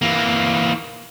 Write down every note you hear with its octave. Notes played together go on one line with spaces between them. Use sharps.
E3 A#3